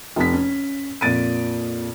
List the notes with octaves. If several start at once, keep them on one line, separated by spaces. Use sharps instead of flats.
F1 F2 B6
C#4
F2 A#2 A6 D7 D#7